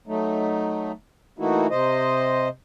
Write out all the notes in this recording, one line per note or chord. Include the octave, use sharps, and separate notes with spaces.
F#3 A3 D#4
E3 A3 A#3 D#4 E4 F#4
C3 C5 D#5